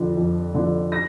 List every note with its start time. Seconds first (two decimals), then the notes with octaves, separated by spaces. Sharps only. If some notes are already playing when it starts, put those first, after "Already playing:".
Already playing: F2 D3 F3
0.16 F2
0.54 D3 F3
0.92 A#6